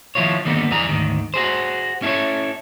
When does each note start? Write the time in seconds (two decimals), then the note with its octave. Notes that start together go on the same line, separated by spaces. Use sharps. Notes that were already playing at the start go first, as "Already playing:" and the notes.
0.15 D#3 F3 E4 F4 C#5
0.45 D3 D#3 G3 A#3 B3
0.71 F2 E3 G3 G#4 A#5
0.89 D2 G#2 D#3
1.34 F#4 G#4 C5
2.02 C#4 E4 G#4 A4 C#5